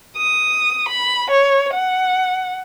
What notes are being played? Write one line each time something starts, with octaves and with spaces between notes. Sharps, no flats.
D#6
B5
C#5
F#5